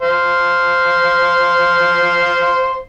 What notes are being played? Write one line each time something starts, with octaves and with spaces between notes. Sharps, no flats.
C5 F5